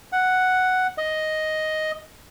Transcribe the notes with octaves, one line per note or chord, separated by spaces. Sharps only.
F#5
D#5